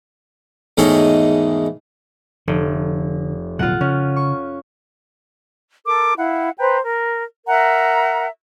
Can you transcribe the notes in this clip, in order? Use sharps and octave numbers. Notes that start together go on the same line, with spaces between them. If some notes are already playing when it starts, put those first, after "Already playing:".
E2 G#2 D#3 A3 G#4 C#5
F1 D3
D1 B2 F#3 F4 F#5
C#3 C#4
C#6
A4 A#4 D6
E4 F5 F#5
B4 C5 G5 A#5
A#4
A#4 E5 F#5 A#5